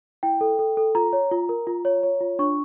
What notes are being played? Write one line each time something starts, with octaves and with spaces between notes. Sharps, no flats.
E4 G5
A4
A4
A4
F4 A#5
C#5
F4
A#4
F4
C#5
C#5
F4
D4 C#6